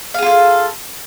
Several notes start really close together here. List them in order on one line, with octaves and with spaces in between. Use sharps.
F5 G#4 F4 A4